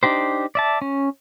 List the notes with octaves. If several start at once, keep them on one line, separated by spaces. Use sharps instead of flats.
D4 D#4 G4 C5
D5 E5 A5
C#4